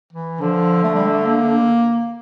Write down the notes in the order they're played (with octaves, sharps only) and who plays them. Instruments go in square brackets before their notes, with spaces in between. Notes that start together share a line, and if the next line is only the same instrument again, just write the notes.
[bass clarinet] E3
[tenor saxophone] D3 [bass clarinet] F3
[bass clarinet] A3
G3
A3
A#3